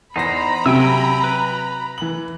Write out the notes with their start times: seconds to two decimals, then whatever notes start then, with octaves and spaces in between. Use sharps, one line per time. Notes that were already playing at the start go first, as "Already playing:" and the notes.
0.16 E2 D#4 C5 A#5 B5 A#6
0.66 C3 F#3 G5 G#5 E6
1.24 B4
1.98 E3 F#7